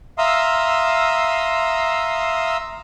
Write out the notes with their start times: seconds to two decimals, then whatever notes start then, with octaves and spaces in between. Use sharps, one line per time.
0.18 E5 F5 A#5 C6 D#6 E6